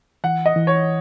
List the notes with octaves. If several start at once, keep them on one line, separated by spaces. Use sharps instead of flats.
E3 F#5
D#5
E3
C#5